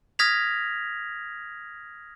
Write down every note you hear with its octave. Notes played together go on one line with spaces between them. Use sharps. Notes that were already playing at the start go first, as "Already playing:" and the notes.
D#6 F6 G#6 A#6 B6 F7